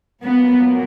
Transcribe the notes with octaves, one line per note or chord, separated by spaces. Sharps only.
A#2 F#3 A#3 B3